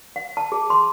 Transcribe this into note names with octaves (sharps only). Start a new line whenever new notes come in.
F#5
A5
G#4
C6